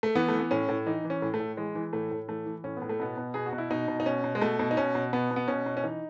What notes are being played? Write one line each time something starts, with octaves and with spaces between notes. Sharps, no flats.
A3
E3 B3
E3 A3
B3
A2 C#4
A2
E3 D#4
E3
C#4
A2
A3
A2
E3 G#3
E3
A2 A3
A2
E3 A3
E3
A2 C#4
A2 B3
A3
B2 B3
B2
B2 G#4
F#4
B2
E4
B2 D#4
B2
D#4
B2 C#4
B2
G#3
B2 A3
B2
D#4
B2 C#4
B2
B2 B3
B2
B3
B2 C#4
B2
C#4
E3 D#4